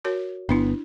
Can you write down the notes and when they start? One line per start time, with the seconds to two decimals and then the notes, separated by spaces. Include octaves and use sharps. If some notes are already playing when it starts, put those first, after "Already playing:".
0.05 F#4 A#4 C#5
0.49 G1 B3 D4 E4